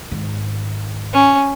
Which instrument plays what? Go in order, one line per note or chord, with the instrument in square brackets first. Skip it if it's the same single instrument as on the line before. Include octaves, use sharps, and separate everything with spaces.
[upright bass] G#2 D#3
[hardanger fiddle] C#4